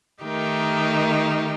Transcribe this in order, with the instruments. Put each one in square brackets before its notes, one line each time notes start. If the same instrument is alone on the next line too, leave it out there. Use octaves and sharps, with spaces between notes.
[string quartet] D#3 A3 D#4 G4 A#4